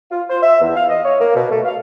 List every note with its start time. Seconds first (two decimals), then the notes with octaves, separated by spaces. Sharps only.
0.11 F4
0.30 C5
0.42 E5
0.61 E2
0.75 F5
0.89 D#5
1.05 C#5
1.20 A#3
1.35 B2
1.51 A3
1.65 F5